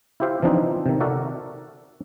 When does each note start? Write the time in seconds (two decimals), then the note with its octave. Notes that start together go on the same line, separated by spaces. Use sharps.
0.20 E4 F4 G4 C5 E5 F5
0.42 E3 F3 C4 D4 D#4 F4
0.86 C3 D#3
1.00 F#4 A4 A#4 D5 E5 F#5